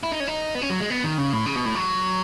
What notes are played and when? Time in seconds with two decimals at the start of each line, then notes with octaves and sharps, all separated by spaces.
0.03 E4
0.12 D#4
0.20 C#4
0.27 D#4
0.55 B3
0.62 C#4
0.70 F#3
0.80 G#3
0.90 B3
1.04 D#3
1.18 C#3
1.33 A2
1.46 C#3
1.56 B2
1.65 A2
1.75 F#3